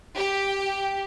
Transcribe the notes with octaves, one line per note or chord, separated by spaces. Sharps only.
G4